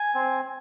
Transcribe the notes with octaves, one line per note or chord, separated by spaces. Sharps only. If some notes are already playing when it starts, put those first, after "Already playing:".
Already playing: G#5
C4